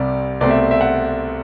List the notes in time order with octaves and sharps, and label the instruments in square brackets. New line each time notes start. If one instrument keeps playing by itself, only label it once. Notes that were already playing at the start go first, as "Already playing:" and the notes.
Already playing: [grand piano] C2 C3 G3 D5
C2 B2 A3 C4 D5
E5
E5
F#5